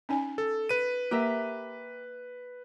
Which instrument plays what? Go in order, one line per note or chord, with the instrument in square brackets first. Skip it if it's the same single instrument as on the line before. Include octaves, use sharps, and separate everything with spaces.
[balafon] C#4 D#4 G#5
[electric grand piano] A4
B4 D#7
[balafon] A#3 [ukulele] G4 A#4 E5